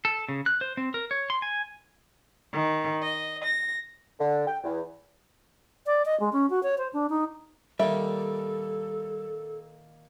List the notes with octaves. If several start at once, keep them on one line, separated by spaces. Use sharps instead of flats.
A4
C#3
F#6
C5
C4
A#4
C#5
C6
G#5
D#3
D#5
A#6
D3
G5
E2
D5
D#5
G#3
C#4
F#4
C#5
C5
D4
D#4
A#2 D#3 G3 A4 E5